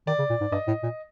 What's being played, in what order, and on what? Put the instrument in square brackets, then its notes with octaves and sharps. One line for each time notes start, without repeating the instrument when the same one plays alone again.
[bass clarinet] D#3 [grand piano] D5
[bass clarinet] C#3
A#2
G#2
[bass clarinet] G2 [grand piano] D#5
[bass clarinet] A2
A#2